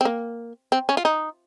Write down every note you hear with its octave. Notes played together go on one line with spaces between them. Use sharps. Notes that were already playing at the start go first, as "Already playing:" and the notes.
C4
A#3
C4
C#4
F4
D#4